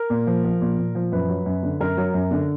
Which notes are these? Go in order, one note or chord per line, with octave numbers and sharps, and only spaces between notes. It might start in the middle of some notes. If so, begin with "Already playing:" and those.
Already playing: A#4
A#2
F3
F3
A#2
A#2
F3
F#2 B4
F#3
F#2
D3
F#2 A#4
F#3
F#2
D3